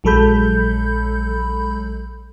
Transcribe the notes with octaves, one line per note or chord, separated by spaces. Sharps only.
A#1 F#3 G#3 A4 B5 G6